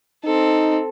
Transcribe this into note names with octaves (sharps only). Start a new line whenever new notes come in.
C4 D#4 A4